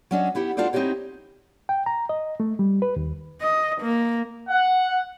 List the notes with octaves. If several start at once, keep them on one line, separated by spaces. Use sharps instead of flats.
F#3 C#4 D4 D#5
B3 E4 G4 F#5
D4 F4 F#4 A4 C5 D5
C4 D#4 E4 F#4 G4 C#5
G5
A#5
D#5
A3
G3
B4
D#2
D#5
A#3
F#5